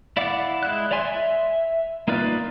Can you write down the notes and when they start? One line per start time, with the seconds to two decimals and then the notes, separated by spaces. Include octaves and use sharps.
0.17 E4 D5 F5 F#5 D6
0.63 G#3 E4 F#6
0.91 C#5 D5 E5 G#5 C6
1.05 E5
2.08 A#3 D#4 F4 B4 D5